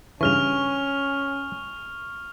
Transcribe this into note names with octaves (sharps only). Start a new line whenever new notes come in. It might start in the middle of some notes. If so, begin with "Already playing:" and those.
G2 C#3 E3 C#4 C#6 F6 F7